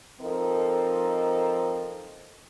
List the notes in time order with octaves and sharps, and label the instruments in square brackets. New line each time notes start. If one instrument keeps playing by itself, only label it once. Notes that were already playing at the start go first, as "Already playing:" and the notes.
[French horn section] F3 C4 D#4 A4 A#4